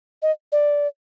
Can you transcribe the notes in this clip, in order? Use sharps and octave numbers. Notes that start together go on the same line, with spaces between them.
D#5
D5